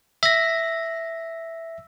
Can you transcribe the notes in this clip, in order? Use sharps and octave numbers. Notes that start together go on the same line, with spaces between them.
E5 A#6